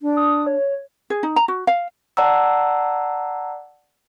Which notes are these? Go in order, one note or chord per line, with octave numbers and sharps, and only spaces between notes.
D4
D#6
C#5
G#4
D#4
A#5
F#4
F5
D5 F#5 A5 A#5 E6